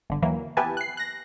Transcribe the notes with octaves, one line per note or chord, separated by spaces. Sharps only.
G1 D3
D#2 E3 F#3 A#3
B3 E4 G4 B4 G#5 A5
F#6 C7
F#6 A#6